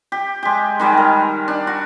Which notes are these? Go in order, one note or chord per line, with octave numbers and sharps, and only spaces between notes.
G4
G#3 G4
D#3 G3 G#3
A#4
D4
F#4